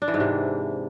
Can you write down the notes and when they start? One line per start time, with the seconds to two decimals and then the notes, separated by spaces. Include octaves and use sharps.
0.02 D4
0.08 E3
0.14 G#2
0.20 C3